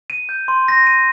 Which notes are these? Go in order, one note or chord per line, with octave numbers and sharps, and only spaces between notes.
D#7
G6
C6
A#6
D#7